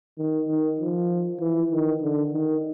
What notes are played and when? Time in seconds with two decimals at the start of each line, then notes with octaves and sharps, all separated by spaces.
0.18 D#3
0.48 D#3
0.80 F3
1.41 E3
1.71 D#3
2.02 D3
2.33 D#3